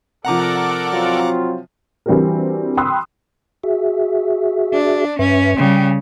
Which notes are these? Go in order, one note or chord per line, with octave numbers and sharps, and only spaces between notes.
C3 F3 A4 A#4 D5 F#5 A#5 D6
F#3 C4 F4
E3 G3 C4 D4 F#4 A#4
G5 B5 C6 D#6 E6 F#6
F#4 G#4 E5
D4
G2 C#4 B4 E5
C#3 G3 G5